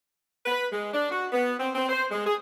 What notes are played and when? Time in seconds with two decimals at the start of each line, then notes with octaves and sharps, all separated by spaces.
0.46 B4
0.72 G#3
0.93 D4
1.10 F#4
1.33 B3
1.59 C4
1.74 C4
1.89 C5
2.11 G#3
2.25 G#4